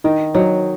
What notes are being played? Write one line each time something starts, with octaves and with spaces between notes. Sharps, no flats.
D#3 D#4
F#3 D#4